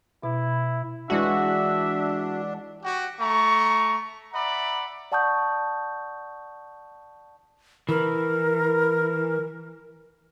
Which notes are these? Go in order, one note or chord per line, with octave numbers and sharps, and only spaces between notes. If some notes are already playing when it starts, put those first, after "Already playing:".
B2 E4
E3 G#3 D4 F#4 E5 F#5
F#4 G4
A3 A#5 C#6
D5 E5 F#5 A#5 B5
D5 F#5 A5 C#6 D#6 G6
E3 A#4